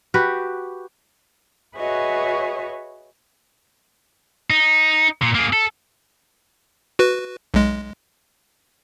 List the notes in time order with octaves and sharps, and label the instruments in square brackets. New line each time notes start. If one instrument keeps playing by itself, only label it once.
[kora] F#4 G4 B4
[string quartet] F#4 G#4 B4 C#5 D#5 E5
[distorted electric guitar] D#4
A#2
A#3 G#4
A4
[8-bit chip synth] F#4 B4
B1 G#3